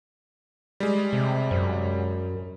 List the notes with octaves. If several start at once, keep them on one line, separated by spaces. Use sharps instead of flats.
G3 G#3
C3
F#2